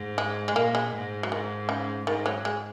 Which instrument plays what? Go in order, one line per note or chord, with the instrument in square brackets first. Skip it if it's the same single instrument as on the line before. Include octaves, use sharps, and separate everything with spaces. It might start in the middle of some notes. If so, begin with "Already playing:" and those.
Already playing: [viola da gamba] G#2
[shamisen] G#3
G#3
[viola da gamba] A#2 [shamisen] A#3
[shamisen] G#3
[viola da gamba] G#2
[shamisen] F#3
[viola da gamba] G#2 [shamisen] D#3
[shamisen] C#3
[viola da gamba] G#2 [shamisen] D#3
[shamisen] F#3
G#3